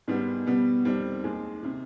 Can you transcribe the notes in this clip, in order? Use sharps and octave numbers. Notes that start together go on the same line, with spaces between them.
G#2 D#3 G3 B3
B2 G3 B3
F2 D#3 G3 C4
D#2 D#3 G#3
C3 D#3